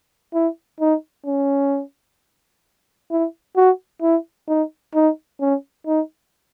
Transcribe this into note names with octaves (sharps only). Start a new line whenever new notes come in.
E4
D#4
C#4
E4
F#4
E4
D#4
D#4
C#4
D#4